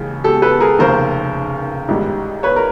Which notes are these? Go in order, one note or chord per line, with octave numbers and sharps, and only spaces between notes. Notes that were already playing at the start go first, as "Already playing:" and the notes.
Already playing: D#2 C#3 E3 G#3
G4 A4
A4 B4
G#4 A#4
F1 D#2 C#3 A#4 C5
A1 G#2 D#3 G3
B4 C#5
A#4